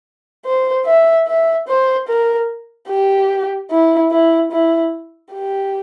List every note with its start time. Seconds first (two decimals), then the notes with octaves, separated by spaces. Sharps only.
0.45 C5
0.86 E5
1.27 E5
1.68 C5
2.08 A#4
2.89 G4
3.70 E4
4.11 E4
4.51 E4
5.33 G4